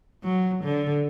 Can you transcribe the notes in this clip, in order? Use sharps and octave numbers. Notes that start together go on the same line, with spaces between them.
F#3
D3